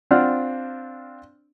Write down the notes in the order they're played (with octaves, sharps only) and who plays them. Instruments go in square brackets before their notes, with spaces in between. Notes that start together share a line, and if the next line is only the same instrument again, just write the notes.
[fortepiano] C4 D4 F4 F#5 F6